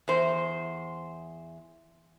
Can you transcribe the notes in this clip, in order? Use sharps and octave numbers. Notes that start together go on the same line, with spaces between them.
E2 C5